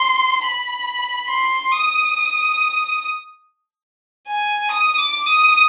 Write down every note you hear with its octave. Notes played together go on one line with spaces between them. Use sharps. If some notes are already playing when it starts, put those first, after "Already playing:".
Already playing: C6
B5
C6
D#6
G#5
D#6
D6
D#6